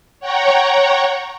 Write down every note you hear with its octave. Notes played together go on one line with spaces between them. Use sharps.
C#5 F#5 G5 A#5 C#6